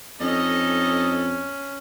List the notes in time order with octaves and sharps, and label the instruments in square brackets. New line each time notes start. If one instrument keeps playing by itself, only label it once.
[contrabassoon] F2 [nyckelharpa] C#4 [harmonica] D#4 A4 D#5